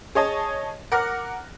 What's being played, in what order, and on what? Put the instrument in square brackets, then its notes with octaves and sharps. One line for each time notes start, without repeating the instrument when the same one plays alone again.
[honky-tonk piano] G#4 C#5 D#5 A5
A#4 F#5 D6 F6 F#6 A#6